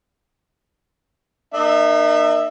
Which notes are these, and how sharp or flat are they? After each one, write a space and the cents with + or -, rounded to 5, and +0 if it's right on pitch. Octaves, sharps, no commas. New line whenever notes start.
A#3 +0 D#4 -40 E5 +0